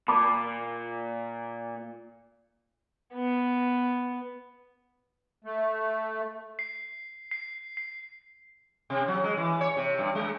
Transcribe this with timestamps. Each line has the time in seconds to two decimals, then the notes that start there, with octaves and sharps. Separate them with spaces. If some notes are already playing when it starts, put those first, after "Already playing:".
0.08 A#2 A5 B5 D6
3.15 B3
5.44 A3
6.59 C7
7.31 C7
7.77 C7
8.90 C3
9.08 F#3
9.24 G#3
9.37 E3
9.61 C#5
9.77 C3
9.99 G2
10.15 G#3